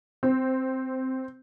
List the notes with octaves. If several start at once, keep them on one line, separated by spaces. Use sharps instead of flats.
C4